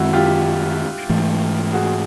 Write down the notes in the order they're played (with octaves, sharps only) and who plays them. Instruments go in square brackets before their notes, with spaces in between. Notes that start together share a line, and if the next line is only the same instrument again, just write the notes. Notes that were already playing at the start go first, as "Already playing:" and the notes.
Already playing: [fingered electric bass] F#2 D#3 G#3 C4 [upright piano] E4 F#4
[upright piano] F4 G4
[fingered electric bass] G#2 E3 A3
[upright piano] F#4 G#4